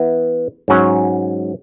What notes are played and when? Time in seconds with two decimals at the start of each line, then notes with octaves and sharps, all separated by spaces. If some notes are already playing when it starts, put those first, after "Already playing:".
Already playing: E3 B3 E4 B4
0.68 G#2 F#3 C#4